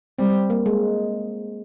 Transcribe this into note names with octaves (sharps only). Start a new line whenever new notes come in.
G3 C4
A#3
G#3